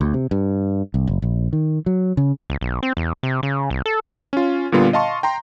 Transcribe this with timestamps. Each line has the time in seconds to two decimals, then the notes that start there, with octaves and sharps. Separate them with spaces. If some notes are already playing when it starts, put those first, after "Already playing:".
0.01 D2
0.14 C3
0.31 G2
0.94 C2
1.07 F#1
1.22 A#1
1.53 D#3
1.86 F#3
2.17 C#3
2.50 C#2
2.61 B1
2.83 C4
2.97 E2
3.23 C3
3.43 C#3
3.70 C2
3.86 A4
4.33 C#4 F4
4.72 A#2 D3 G3 B3 F4
4.93 D#5 F5 A5 C6 C#6
5.23 G5 A#5 C6